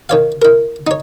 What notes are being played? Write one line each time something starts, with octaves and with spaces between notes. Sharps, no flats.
D#3 C#5 F5
E4 A#4
D#4 C#5